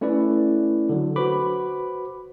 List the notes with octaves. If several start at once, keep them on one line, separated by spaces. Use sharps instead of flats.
A3 C#4 E4 B4 D5
D3 F#3
F#4 B4 C5 B5 D6